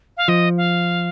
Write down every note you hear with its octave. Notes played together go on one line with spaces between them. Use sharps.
F5
F3 D#5
F5